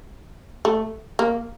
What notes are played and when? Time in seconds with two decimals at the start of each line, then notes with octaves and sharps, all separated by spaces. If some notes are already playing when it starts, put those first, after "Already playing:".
0.65 A3
1.19 A#3